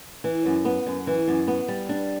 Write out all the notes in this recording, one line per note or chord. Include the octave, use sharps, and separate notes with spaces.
E3
F#2
B3
F#2
E3
F#2
B3
G3
D4